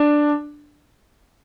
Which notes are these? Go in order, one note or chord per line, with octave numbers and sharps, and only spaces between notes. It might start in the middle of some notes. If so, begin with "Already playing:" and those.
Already playing: D4